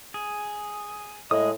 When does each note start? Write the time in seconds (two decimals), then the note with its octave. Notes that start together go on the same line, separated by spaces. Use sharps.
0.14 G#4
1.31 A2 G#3 D#5 D#6